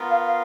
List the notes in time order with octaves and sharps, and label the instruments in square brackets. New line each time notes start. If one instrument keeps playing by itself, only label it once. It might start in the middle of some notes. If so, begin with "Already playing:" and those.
Already playing: [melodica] B3 F4 A#4
[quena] F5
F5